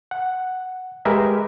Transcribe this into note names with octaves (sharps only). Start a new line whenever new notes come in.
F#5
G#3 G4 G#4 A#4 B4 E5